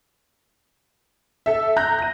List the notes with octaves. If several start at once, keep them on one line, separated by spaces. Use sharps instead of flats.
A4 E5
A#5 F#6 G6 A#6
A#6 D#7